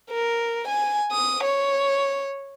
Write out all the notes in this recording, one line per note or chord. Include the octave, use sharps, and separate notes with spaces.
A#4
G#5
D#6
C#5